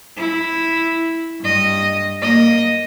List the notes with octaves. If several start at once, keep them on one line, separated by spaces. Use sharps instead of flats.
E4
G2 D#5
A#3 D#5